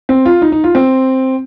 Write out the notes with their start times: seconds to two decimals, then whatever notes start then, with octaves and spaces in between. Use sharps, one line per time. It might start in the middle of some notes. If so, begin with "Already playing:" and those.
0.09 C4
0.26 F4
0.42 D#4
0.52 D#4
0.64 F4
0.75 C4